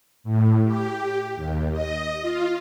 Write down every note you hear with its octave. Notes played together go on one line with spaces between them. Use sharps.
A2
G4
D#2
D#5
F4